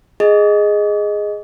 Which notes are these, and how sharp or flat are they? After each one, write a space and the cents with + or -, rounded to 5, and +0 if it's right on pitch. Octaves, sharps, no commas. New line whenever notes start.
G#4 +0 D#5 +0